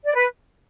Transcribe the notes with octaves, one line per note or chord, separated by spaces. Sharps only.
D5
B4